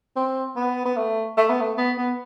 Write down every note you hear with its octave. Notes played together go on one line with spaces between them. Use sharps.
C4
B3
B3
A3
A3
B3
A3
B3
B3